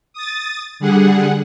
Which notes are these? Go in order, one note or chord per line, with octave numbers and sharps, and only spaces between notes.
D#6 A6
D3 G3 G#4 F#5